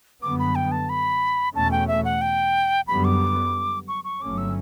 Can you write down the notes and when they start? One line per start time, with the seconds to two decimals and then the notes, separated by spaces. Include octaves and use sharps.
0.22 F#2 D3 G3 B3 D6
0.39 B5
0.55 G5
0.72 A5
0.89 B5
1.55 E2 B2 A3 C#4 A5
1.72 G5
1.88 E5
2.05 F#5
2.21 G5
2.88 F#2 D3 G3 B3 B5
3.05 D6
3.88 C#6
4.04 C#6
4.21 G1 G2 F#3 A3 C#4 D6
4.38 E6